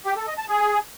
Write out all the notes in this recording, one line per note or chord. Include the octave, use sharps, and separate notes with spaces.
G4
A4
D#5
A5
G#4